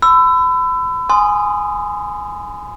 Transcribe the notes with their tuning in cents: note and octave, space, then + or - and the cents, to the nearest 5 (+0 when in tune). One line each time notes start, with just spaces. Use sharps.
B5 +35 E6 +15
G#5 +0 C6 -20 D#6 -5